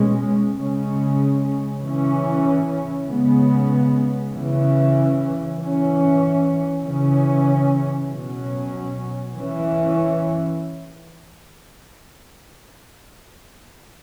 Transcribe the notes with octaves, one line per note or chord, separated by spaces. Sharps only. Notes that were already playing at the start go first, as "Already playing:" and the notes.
Already playing: B2 G#3 C#4
C#3 G#3 C#4
C#3 E3 C#4
C#3 G#3 B3
C#3 E3 C#4
E3 C#4
C#3 E3 C#4
B2 F#3 C#4
E3 C#4